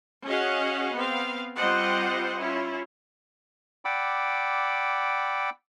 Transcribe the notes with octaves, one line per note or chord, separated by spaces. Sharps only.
C#4 F#4 G#4 D#5 F5 F#5
B3 C4 F5
G3 C4 F4 C5 D#5 F#5
C#4 E4 F4
D5 F#5 G5 B5 D6 E6